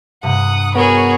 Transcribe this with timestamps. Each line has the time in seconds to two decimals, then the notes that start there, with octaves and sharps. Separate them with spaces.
0.23 G2 C3 F#5 D#6
0.75 B3 F#4 G#4 A#4 C#5 B5 D7